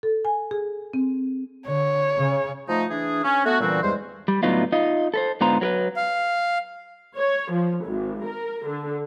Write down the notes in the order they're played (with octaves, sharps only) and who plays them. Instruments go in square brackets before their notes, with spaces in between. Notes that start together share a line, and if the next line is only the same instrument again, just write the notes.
[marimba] A4
G#5
G#4
C4
[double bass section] D3 [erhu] C#5
[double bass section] C#3
[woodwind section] F3 A3 D#4
E3 D4 G#4
C#4
A3 B3 F#4
A#2 D3 E3 G3 C4 F#4
E2 G2 G3 G#3 C5
[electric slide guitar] G3
A2 D3 F#3 B3 D#4 F4
D#4 F4 D#5
A4 B4 C5
G#2 D3 B3 F4 C5 A#5
F#3 A#4 B4
[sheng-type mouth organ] F5
[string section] C#5
F3
G#1
A#4
D3